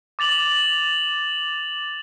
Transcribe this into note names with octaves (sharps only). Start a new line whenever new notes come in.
D6 A6 F7 F#7